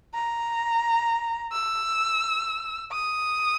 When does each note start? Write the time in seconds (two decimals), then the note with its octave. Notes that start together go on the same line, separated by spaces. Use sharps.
0.14 A#5
1.52 E6
2.91 D#6